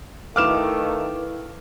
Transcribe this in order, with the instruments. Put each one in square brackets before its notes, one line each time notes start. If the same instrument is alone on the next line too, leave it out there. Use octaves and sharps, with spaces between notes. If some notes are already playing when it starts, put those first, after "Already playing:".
[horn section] D#3 A3 [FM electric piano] E4 B4 F5 [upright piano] D6 F6 E7